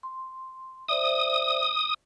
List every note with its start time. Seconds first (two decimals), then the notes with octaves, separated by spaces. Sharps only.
0.03 C6
0.88 C5 D5 E5 D#6